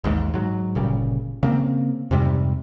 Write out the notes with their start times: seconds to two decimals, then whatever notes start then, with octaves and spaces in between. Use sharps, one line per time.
0.04 A1 D#2 G#2
0.34 G#2 F#3
0.75 G1 A#2 C#3 G3
1.43 C#3 A#3 C4
2.11 F2 G#2 C3 G3